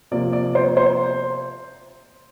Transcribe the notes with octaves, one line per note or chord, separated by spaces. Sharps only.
C3 F3 A#3 D5
D5
C5
C5